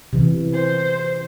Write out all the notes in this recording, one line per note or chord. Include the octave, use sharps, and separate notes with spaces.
C3 E3
C5